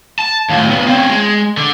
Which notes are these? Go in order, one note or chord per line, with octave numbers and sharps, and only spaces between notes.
A5
D#2 A2
C#3 B3
C4 C#4
G#3
D3